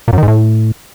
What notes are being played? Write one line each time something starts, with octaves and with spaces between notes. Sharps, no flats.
A#2
F#2
D#3
G#2
A2